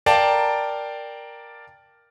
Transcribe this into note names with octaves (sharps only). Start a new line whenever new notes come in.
A#4 D5 F5 G5 A5 A#5